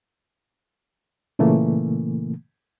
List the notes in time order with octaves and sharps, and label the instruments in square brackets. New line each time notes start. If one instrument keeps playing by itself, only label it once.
[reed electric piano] A#2 C#3 E3 A3 A#3